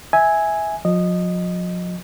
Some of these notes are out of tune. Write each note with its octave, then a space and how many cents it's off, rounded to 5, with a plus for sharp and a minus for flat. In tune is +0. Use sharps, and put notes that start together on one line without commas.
E5 -15 G#5 +0
F3 +40 D#5 -10